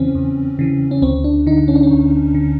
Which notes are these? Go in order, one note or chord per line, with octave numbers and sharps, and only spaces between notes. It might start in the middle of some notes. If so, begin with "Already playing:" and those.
Already playing: E2 C#3 E3 C4 C#4
E2
C#3 E3
C#4
D2 C4
D4
D3 D#4
C#4
D4
C#4
D2
D3